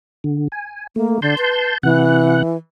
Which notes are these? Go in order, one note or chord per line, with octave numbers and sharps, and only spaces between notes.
D3
G#5
A3 A#3
D3 A5 C6 G6
B4
C3 E3 F#5 F#6